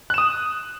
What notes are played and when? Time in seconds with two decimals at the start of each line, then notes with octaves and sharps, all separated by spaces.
0.10 F#6
0.14 E7
0.18 D#6